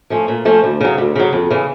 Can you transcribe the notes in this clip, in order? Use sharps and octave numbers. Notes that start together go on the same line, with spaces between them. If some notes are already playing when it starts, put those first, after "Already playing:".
F3 A3 C#4
A#2
F3 A3 C#4
D2
C#3 F#3
D2
C#3 F#3
F2
C#3 E3